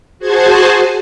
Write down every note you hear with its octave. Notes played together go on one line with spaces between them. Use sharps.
F#4 G#4 C5 G#5 A5